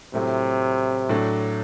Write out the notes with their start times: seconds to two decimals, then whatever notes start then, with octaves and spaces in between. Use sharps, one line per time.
0.14 A2 C3 F#3 A3 E4
1.09 A2 F#3 A3 D4